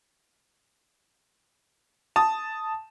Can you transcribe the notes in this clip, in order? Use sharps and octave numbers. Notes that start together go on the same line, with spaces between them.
A5 D#6